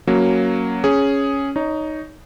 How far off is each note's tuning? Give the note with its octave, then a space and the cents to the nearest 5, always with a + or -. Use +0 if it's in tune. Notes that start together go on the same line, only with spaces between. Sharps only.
F#3 +0 A#3 +0 C#4 +0
C#4 +0 G#4 +0
D#4 +0 C#5 +20